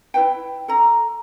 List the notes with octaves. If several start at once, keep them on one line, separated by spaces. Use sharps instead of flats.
E4 B4 G5
A4 A#5